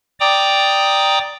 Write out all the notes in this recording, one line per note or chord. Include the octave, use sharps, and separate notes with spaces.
D5 G5 A#5 D6 D#6